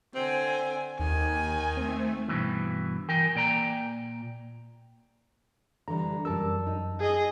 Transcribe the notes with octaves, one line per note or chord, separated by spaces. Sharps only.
D3 C4 G#5
D#2 D#3 G#5
A3 C4
G2 B2 E3
E3 A#4 G5
A#2 D5 G5 A#5
D3 E3 G3 A#5
F#2 G3 A#4 A5 E6
D#4
G#4 D#5